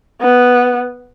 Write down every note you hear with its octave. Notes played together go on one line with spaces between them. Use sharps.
B3